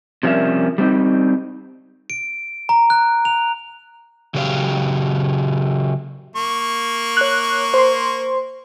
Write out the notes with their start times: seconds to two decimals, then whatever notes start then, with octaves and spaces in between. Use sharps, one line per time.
0.23 C3 F3 G3 C#4 A#4 E5
0.78 G3 C4 D#4
2.10 D7
2.69 A#5
2.90 F#6
3.25 F7
4.34 C#3 F#3 G4 C#5 F5
6.36 A#3 C#6
7.17 C#5 F#6
7.74 C5 C6